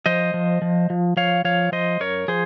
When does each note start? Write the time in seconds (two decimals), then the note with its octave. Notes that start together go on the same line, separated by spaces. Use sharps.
0.06 F3 C5 D#5
0.34 F3
0.62 F3
0.90 F3
1.17 F3 C#5 F5
1.44 F3 C#5 F5
1.72 F3 C5 D#5
2.00 F#2 A#4 C#5
2.28 F3 G#4 C5